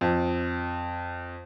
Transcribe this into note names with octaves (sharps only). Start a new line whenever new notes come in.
F2